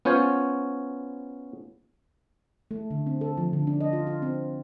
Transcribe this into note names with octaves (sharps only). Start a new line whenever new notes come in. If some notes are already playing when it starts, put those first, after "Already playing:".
B3 C#4 F4 C5 C#5
A3
D3
C4
A4
F3
D3
D4
D#5
F4
F4
C4